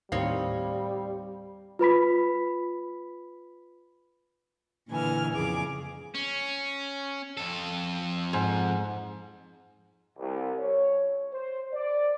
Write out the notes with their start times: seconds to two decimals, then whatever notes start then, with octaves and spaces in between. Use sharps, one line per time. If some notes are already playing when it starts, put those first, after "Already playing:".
0.12 D#2 A2 G3 C4 D#4 C#5 F5
1.79 F4 B4 B5 B6
4.88 A#2 D3 E3 G#5 F6
5.33 F2 C#3 G#4 D6
6.15 C#4
7.37 F2 A4
8.33 G#2
10.17 C2
10.59 C#5
11.32 C5
11.73 D5